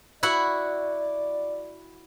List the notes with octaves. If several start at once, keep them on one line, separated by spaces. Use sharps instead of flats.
E4 F#4 D5 F#5